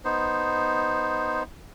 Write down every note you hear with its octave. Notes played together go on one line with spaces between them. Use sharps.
B3 D#4 C5